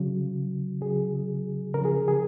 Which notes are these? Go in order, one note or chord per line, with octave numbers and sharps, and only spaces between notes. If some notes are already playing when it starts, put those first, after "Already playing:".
Already playing: C#3 F#3
C#3 F#3 G#4
C#3 F3 A#4
G#4
G#4